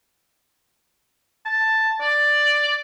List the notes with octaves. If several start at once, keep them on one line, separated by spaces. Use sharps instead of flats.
A5
D5